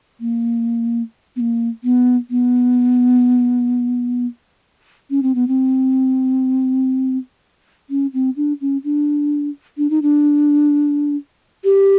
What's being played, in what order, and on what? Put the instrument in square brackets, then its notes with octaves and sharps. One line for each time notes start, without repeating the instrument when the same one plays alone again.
[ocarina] A#3
B3
A#3
B3
B3
C#4
C4
B3
C4
C#4
C4
D4
C#4
D4
D4
D#4
D4
G4